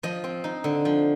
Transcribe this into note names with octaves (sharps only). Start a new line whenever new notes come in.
F3 D#5
C4
D#4
D3
F3